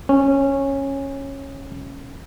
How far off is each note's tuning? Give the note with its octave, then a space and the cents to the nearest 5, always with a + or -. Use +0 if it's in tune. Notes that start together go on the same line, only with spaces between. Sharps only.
C#4 -15